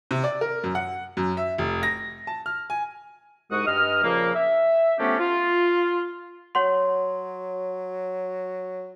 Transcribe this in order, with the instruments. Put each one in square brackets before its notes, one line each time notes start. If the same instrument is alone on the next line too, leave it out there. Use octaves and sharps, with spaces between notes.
[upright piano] C3
D5
A#4
F#2
F#5
F#2
E5
F1
A#6
A5
F6
G#5
[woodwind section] C2 G#2 G#3 F#4 F#5 D#6
G2 D#5 F6
A#2 C#3 F3 A#3
E5
F3 A3 B3 C#4 D4 G4
F4
[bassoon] F#3 [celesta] C#5 F#5 C6